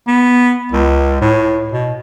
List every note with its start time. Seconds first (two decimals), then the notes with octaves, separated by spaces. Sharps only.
0.07 B3
0.72 C#2
1.21 A2
1.72 B2